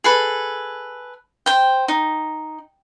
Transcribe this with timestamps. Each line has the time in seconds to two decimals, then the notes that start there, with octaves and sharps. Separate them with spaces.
0.04 G#4 A4 B4
1.46 C5 G5
1.88 D#4